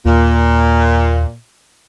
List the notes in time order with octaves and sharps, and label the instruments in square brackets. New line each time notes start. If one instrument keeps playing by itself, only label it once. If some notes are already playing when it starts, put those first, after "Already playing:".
[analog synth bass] D#2 [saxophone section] A#2